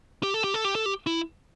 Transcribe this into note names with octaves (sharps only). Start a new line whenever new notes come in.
G4
A4
G4
A4
G4
A4
G4
E4